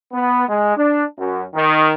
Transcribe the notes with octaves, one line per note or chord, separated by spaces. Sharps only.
B3
G#3
D4
F#2
D#3